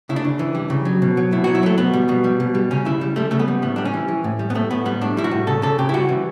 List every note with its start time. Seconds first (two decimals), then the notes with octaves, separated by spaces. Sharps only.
0.09 C#3 E4
0.16 D4
0.25 C#3
0.39 E3
0.55 G3
0.70 C#3
0.85 F#3
1.02 B2
1.17 F#3
1.32 B2 E4
1.44 F#3 F#4
1.55 E4
1.63 F#3 A3
1.78 B2 B3
1.93 G3
2.09 B2
2.24 G3
2.40 B2
2.55 G3
2.71 C#3 C#4
2.85 C#3 E4
3.01 G3
3.16 G3 A3
3.31 C#3 A3
3.39 B3
3.48 G3
3.62 A2 B3
3.76 G3 D4
3.85 C#4
3.94 E3
4.08 E3
4.24 A2
4.39 G3
4.50 B3
4.55 A2 A3
4.71 A2 B3
4.85 G3 B3
5.01 A2 D4
5.17 G3 E4
5.24 F#4
5.31 A2
5.47 C#3 A4
5.62 C#3 A4
5.79 C#3 G4
5.89 E4
5.94 G3 F#4
6.09 E3